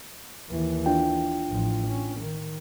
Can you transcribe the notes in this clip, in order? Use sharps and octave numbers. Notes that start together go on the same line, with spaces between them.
D#2 E3
D4 F4 G5
A1 F3
C#4
D#3